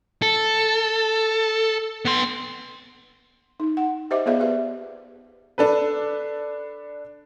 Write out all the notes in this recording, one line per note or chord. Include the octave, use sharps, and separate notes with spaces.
A4
B3 C6
D#4
F#5
G4 C5 D#5 E5 D6
B3 F4 G#4 D5 E5 F5
G4 B4 E5
D4 A4 B4